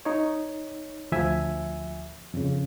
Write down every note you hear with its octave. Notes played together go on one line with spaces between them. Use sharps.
D#4 C#5
D2 F3 E5 G#5
F2 C#3